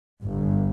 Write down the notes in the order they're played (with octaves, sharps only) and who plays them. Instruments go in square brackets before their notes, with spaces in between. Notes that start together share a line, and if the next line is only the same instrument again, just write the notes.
[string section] G1